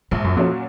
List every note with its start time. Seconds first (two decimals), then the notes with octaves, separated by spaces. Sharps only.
0.11 A#1 G#2
0.24 F#2
0.36 F2 A#2 F#3 C#4 F#4